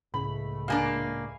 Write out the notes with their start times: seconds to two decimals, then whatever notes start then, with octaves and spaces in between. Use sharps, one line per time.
0.14 C#2 A2 C#3 A3 B5
0.68 A#2 A#3 D4 F5 G#5